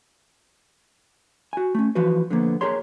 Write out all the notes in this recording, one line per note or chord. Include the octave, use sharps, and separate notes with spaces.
F#4 G#5
A3 C#4
E3 F3 F#4 B4
D3 F3 A#3 B3
G4 G#4 A#4 C#5 C6